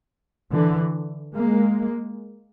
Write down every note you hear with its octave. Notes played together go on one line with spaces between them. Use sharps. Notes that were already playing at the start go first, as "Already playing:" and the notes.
D3 E3
G#3 A#3